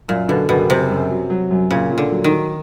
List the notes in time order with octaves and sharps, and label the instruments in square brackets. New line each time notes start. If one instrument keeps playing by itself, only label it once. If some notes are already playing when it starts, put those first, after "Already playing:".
[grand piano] F#2 [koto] A#2
[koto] B2 [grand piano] D3
[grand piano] F#1 [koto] B2
[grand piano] F#1 [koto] C3
[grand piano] F#2
F#3
F#3
F#2
[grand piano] A#2 [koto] C#3
[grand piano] A#2
[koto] D3
[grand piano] F#3
[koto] D#3
[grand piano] F#3